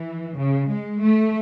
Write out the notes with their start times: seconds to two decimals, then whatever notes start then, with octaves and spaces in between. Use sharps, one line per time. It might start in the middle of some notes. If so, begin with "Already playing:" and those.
Already playing: E3
0.37 C#3
0.69 G#3
1.01 A3